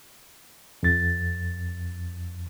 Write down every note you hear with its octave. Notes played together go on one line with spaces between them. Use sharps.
F2 A6